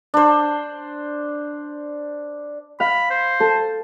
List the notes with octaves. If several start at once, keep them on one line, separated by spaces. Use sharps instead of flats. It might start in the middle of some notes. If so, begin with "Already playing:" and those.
D4 C5
F5 B5
C5
A4